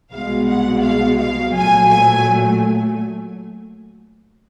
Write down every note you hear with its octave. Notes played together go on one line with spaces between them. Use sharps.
C2 B2 G#3 F5
F#5
F5
F5
A#2 F#3 A3 G#5
G#5